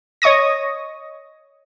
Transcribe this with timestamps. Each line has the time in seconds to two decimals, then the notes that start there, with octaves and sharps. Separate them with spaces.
0.22 C#5 D#5 C#6 D#6 A#6